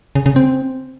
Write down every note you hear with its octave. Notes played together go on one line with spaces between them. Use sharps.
C#3
C#3
C4